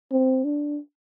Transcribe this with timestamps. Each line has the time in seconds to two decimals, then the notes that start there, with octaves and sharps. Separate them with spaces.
0.12 C4
0.45 D4